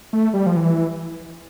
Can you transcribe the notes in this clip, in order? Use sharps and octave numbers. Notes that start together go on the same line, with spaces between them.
A3
G3
F3
E3